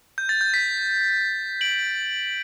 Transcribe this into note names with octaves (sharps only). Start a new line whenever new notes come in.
G6
A6
G6
B6
D7 F#7